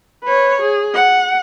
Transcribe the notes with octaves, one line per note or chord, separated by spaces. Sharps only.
B4 C#5
G#4
F#5